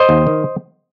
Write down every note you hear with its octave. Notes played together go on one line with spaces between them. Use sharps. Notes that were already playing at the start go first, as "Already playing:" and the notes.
Already playing: C5 D#5
D#2
D#3